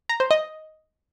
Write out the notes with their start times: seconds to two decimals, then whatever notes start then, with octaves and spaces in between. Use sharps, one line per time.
0.09 A#5
0.20 C5
0.31 D#5